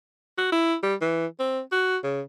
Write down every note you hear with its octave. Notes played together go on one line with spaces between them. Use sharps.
F#4
E4
G3
E3
C4
F#4
C#3